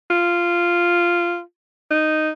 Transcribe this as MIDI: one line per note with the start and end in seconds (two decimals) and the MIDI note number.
0.10 1.41 65
1.91 2.30 63